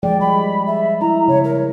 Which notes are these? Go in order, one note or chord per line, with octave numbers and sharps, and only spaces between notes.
F3 G#3 D5 G5
G3 B5
E5
E4 E5 A#5
C#3 C#5
A#4